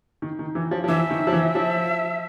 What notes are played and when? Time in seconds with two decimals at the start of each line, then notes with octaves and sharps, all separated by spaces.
0.22 D#3
0.39 D#3
0.55 E3
0.71 F3
0.84 F3
0.88 E3 E5
1.10 D#3
1.27 F3
1.32 E3
1.55 F3